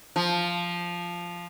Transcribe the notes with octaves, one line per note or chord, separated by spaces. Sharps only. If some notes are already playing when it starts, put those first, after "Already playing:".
F3